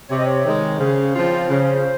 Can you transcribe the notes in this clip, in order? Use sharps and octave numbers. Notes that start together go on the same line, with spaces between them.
C3 C#5
D#5
C#5
D#3 G#3
C#3 C5
F3 C4 F4
C#3